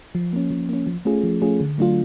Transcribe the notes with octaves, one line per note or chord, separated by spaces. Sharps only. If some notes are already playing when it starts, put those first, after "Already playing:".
F3
A#3 C#4
F3
A#3 C#4
F3
A3 C#4 F4 G#4
F3
A3 C#4 F4 G#4
D3
F#3 A3 D4 F4